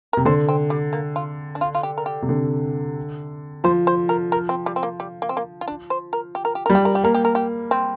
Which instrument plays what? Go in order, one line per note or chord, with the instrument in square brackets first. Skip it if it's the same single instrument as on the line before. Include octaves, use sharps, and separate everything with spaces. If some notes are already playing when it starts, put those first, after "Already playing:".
[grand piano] C3 [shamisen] A#4
[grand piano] D3 [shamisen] C5
[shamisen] C4
G3
A#3
F4
D4
F4
F4
G4
A#4
G4
[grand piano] C3
D3
[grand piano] F3 [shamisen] C5
[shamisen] C5
A#4
A#4
C4
G3
C4
A#3
G3
A#3
C4
A#3
F4
D4
C5
A#4
G4
A#4
G4
A#4
[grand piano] G3
[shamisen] G4
A#4
G4
[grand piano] A#3 [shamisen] A#4
[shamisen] G4
A#4
G4
C4